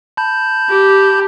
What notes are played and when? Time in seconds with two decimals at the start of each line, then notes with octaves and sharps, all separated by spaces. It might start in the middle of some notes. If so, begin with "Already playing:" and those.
0.17 A5 B5 G6
0.70 G4